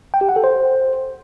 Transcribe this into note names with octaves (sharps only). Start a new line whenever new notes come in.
G5
G4
F#5
A4
C5